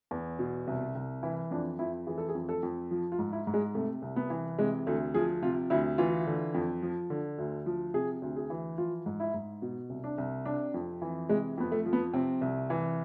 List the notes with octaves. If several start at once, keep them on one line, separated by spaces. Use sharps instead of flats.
E2
B2
C2
C2
E3 E4
F2 D4
F2 E4
E3 G#4
A4
G#4
F2
A4
F2
F3
F4
G#2
E4
G#2
G#3
C3 A3
C2
B3
E3
C3 G#3
D2 A3
F3 G#4
C3 F4
D2 E4
E3 F4
D3
F2
F3
D3
D2
F3
C3 G#4
D2
G#4
E3
F3 F4
G#2
E4
G#2
B2
C2
D4
C2
C3 D4
F2
E3
C3 G#3
F2 B3
A3
F3
B3
C3 C4
C2
E3